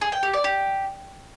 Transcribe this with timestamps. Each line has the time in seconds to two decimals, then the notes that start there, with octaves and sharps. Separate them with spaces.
0.01 G#4
0.12 G5
0.23 G4
0.33 D5
0.44 G4